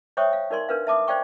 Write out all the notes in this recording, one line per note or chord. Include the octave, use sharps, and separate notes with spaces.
C5 C#5 E5 G5 C#6 D#6
F5
D#4 A#4 D5 C6
D4 A#4 B4 F5
E5 A5 D6 D#6
C5 D5 F5 G5 C#6